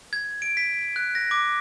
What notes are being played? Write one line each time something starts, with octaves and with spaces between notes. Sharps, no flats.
G#6
D7
B6
F#6
A#6
D6